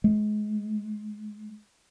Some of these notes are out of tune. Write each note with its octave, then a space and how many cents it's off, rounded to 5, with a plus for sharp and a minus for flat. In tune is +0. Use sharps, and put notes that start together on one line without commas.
G#3 +30